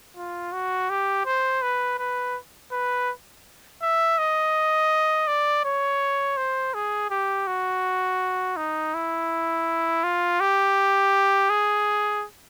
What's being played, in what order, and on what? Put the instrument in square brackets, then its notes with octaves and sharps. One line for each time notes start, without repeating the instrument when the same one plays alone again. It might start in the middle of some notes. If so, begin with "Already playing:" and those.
[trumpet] F4
F#4
G4
C5
B4
B4
B4
E5
D#5
D5
C#5
C5
G#4
G4
F#4
D#4
E4
F4
G4
G#4